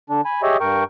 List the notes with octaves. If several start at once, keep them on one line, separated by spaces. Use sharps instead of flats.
D3 D4
G#5 B5
G4 G#4 C#5 D#5 E5
G2 A#4 G5 C#6